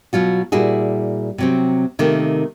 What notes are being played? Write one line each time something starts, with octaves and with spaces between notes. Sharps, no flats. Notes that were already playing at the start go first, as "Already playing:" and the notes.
B2 F#3 F4 F#4
A#2 G3 E4 F#4 G#4
C3 F#3 C4
C3 D#3 A3 A#3